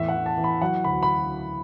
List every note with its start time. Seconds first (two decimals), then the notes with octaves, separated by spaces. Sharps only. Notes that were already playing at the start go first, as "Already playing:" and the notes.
Already playing: E2 A2 E5
0.08 F#5
0.15 E3
0.26 A5
0.38 E3
0.44 B5
0.62 F#3 F#5
0.84 D2 B5
1.03 B5